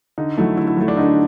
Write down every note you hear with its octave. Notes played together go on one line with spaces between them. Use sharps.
D3 D#4
F#3 A3 E4
D3 E4
E4
F#3 A3
D4
D3 D#4